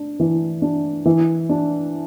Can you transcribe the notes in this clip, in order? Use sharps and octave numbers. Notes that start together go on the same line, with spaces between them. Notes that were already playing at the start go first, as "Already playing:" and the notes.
Already playing: D4
E3
D4
E3
D4